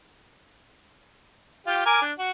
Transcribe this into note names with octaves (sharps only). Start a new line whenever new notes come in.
F4 G4
A#4 G#5 D6
D4
F#4